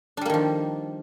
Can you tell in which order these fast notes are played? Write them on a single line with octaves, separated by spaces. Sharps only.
D4 G3 A#3 D#3 F3